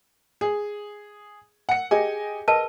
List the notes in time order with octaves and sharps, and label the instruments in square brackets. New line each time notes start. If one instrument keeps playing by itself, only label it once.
[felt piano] G#4
F#5 C#7
[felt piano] G4 D#5 G#5 [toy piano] G#4
[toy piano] A#4 B4 A5 [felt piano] D#5